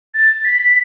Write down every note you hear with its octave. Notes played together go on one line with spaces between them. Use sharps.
A6
B6